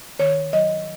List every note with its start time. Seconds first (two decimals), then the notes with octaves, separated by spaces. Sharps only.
0.19 D#3 C#5
0.53 F#3 D#5